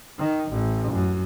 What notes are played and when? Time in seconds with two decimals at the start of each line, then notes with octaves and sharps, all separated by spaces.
0.18 D#3
0.51 A1
0.93 F#2